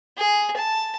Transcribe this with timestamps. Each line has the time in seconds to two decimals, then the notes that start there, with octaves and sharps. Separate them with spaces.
0.18 G#4
0.57 A5